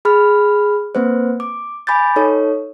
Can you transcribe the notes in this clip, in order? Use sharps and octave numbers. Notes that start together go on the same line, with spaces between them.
G#4 B5 F6
A#3 C4 B4 C5
D6
G#5 B5 D6 G6 A6
D#4 A4 C#5